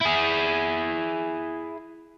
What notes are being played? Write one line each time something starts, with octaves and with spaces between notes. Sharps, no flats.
E4 G#4